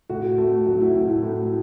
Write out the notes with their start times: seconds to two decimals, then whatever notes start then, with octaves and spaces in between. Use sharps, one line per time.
0.09 A2 F#4
0.38 A3
0.66 F#3 F#4
0.81 E4
0.95 A2 E4
1.09 E4
1.23 A2